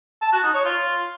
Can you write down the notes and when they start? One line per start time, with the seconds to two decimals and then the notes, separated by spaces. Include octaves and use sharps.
0.22 A5
0.33 F#4
0.43 D#4
0.54 C#5
0.65 F4